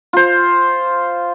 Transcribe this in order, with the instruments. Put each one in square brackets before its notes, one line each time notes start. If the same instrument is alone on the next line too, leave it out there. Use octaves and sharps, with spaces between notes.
[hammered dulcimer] F4 C5